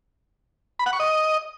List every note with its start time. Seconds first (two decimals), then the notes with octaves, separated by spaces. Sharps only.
0.79 B5
0.86 F#5
0.93 C#6
1.00 D#5